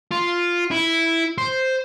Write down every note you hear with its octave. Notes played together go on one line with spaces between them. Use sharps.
F4
E4
C5